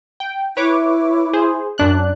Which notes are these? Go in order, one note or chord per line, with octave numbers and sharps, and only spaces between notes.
G5
E4 B4 C#5 D6
G#4 C5
F#2 D4 F#6